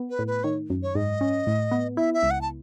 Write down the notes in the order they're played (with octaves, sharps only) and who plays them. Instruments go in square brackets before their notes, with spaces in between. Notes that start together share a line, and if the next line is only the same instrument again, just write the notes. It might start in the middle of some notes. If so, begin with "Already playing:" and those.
Already playing: [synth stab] B3
[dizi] B4
[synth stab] A2
[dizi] B4
[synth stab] D#3 [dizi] C#5
[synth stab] F#2
[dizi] C#5
[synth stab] G#2 [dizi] D#5
[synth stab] C#4
A2
B3
[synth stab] E4 [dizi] E5
[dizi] E5
[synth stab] C#2
[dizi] F#5
A5